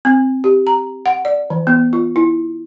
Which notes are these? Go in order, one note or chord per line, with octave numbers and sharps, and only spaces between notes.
C4
G4
A#5
F#5
D5
E3
B3
F4
E4